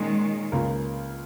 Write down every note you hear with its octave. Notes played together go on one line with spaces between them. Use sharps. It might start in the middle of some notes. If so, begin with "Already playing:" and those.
Already playing: A#2 D#3 G#3 C#4
C#2 C#3 A#3 F4 A#4